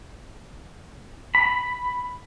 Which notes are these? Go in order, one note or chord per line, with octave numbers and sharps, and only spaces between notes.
B5